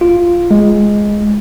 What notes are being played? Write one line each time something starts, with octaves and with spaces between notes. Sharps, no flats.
F4
G#3